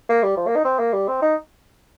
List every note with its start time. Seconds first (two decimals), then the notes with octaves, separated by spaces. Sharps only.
0.09 A#3
0.23 G3
0.37 F3
0.47 A#3
0.56 D#4
0.65 C4
0.79 A#3
0.93 G3
1.08 C4
1.22 D#4